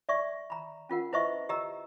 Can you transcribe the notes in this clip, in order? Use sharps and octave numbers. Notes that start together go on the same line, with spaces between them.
D5 E5 C#6
A#5 B5
C#4 F4 A#4 F#5
E4 B4 C5 D#5 E5 C#6
G4 D#5 A#5 E6